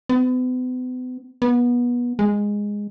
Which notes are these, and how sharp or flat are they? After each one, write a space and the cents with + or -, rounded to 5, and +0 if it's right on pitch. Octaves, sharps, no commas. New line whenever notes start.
B3 +40
B3 -25
G#3 -10